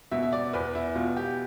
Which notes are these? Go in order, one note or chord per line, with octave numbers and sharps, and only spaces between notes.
B2 E5
E5
D5
E2 B4
E4
B2 F4
G4